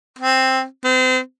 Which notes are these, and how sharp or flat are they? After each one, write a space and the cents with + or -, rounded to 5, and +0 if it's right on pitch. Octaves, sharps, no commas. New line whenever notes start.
C4 +5
C4 -35